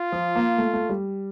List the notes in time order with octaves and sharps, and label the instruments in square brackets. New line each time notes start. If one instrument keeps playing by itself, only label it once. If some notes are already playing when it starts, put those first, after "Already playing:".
Already playing: [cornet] F4
[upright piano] F3
A#3
A3
A3
G3